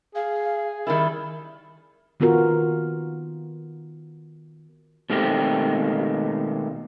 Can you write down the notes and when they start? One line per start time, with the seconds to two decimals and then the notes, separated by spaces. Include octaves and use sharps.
0.15 G#4 F5
0.87 D#3 G3 E4 A#4
2.20 D#3 B3 F4 F#4 A#4
5.10 B2 D#3 G#3 A3 C4 G4